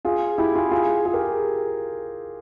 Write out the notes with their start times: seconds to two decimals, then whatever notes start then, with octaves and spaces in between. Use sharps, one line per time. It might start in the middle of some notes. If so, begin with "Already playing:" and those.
0.05 F4 G#4
0.38 E4 G4
0.55 F4 G#4
0.71 F4 G#4
1.05 F4 G#4
1.14 G4 A#4